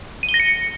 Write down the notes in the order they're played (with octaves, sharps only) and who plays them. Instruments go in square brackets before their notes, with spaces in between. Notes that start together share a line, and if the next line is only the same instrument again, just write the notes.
[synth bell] D#7
G7
A#6
C#7